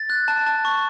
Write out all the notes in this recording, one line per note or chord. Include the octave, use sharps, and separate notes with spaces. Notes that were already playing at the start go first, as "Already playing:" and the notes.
Already playing: A6
F#6
A5
A5
C#6